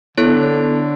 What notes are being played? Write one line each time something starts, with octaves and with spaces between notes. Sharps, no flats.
D3 B3 E4 A4 C#5